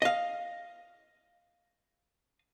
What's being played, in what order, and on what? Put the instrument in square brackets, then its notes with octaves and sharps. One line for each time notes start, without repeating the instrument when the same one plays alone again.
[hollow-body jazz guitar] D#5 F5